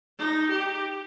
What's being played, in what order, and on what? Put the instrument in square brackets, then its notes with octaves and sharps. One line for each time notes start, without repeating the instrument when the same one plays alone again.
[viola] D#4
G4